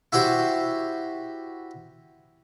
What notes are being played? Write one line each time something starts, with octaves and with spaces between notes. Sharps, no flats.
E4 F#4 G4 C5